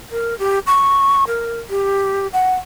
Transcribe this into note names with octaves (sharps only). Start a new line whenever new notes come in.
A#4
G4
C#6
A#4
G4
F#5